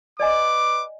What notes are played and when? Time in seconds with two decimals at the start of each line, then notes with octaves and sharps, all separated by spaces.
0.20 B4 D5 D#5 G#5 D6